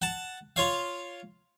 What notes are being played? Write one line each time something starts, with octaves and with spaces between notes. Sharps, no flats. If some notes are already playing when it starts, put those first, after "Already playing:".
F#5 A5
F4 C#5 F5